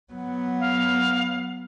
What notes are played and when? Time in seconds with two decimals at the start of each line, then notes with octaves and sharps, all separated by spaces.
0.13 F#3 B3
0.60 F5